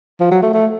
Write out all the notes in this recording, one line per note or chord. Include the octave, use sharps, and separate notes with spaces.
F3
F#3
A3
A3